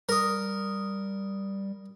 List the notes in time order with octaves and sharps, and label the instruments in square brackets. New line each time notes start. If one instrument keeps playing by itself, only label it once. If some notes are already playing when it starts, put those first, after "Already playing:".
[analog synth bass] G3 [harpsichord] A#4 D#6